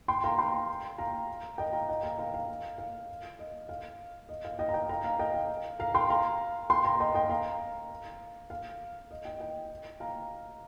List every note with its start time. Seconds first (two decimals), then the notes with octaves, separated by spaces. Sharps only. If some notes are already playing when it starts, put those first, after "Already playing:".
0.08 G5 C6
0.24 F5 A#5
0.38 G5 C6
0.98 F5 A#5
1.58 D#5 G5
1.73 F5 A#5
1.89 D#5 G5
2.03 F5 A#5
2.19 F5 A#5
2.34 F5
2.78 F5
3.39 D#5
3.69 F5
4.29 D#5
4.45 F5
4.59 D#5 G5
4.69 A#5
4.74 D#5 G5
4.89 F5 A#5
5.04 F5 A#5
5.19 D#5 G5
5.34 F5
5.80 F5 A#5
5.94 G5 C6
6.09 F5 A#5
6.70 G5 C6
6.85 F5 A#5
7.00 D#5 G5
7.15 D#5 G5
7.30 F5 A#5
8.50 F5
9.11 D#5
9.25 D#5 G5
9.40 D#5 G5
10.00 F5 A#5